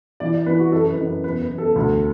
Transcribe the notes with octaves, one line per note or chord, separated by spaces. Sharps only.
E3 D5
D5
E3 B4
F#4
F#2 A4
B4
F#2
B4
E2 B4
B4
E2
A4
D2